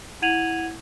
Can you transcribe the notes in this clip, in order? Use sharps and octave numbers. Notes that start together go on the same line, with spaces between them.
E4 F#5 G#6 D#7 F7 F#7